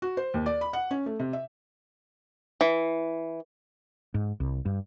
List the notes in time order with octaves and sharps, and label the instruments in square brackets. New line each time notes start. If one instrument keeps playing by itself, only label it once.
[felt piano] F#4
C5
D#2
D5
B5
F#5
C#4
A3
C3
E5
[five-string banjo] E3
[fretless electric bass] G#2
C2
G2